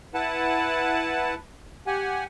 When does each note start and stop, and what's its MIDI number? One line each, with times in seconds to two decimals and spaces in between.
0.14 1.34 64
0.14 1.34 71
0.14 1.34 78
0.14 1.34 81
1.87 2.24 67
1.87 2.24 78
1.87 2.24 80